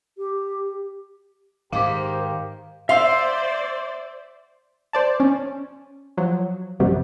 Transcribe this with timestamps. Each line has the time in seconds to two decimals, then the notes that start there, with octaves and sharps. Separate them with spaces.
0.18 G4
1.72 G#2 D#3 G4 A#4 C5 F5 D6
2.89 C5 D5 E5 F5 C6 E6
4.93 C5 D5 A5
5.20 C#4
6.18 F3 F#3
6.80 A#1 F#2 C3 F#3 G3